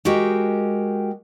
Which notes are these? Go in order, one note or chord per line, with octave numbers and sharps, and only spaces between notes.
G#3 F#4 G4 A#4 G5